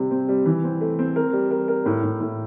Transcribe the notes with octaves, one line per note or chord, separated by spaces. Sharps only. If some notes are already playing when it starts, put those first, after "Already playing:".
Already playing: C3 G3
C4
G3
E3
C4
A3
C4
A#4
G3
A#4
A#4
A2
A2
A2